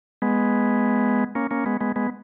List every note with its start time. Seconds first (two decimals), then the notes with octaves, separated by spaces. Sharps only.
0.22 G#3 B3
1.35 A#3 C#4
1.51 A#3 C#4
1.66 G#3 B3
1.81 G#3 B3
1.96 G#3 B3